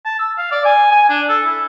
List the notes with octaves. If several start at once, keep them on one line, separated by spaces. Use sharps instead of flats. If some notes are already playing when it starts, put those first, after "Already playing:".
A5
E6
F5
D5
G#5
G#5
D4
A4
E4